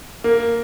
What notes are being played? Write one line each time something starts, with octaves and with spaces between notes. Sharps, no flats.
A#3